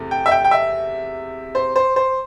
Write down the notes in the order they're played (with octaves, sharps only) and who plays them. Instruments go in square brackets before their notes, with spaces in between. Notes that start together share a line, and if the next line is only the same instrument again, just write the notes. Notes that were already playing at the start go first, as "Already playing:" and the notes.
Already playing: [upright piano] E2 C3 A3
G5
E5
G5
G5
E5
C5
C5
C5